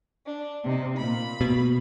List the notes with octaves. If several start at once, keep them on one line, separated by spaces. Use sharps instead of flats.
D4
C3 D#4
A#2 B5
B2